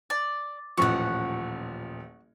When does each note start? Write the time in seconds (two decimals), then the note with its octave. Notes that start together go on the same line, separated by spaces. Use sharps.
0.10 D5
0.78 D#1 A1 F3 F#5 C#6